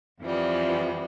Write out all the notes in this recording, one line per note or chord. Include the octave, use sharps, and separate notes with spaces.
F2 E3 F3 G3 B3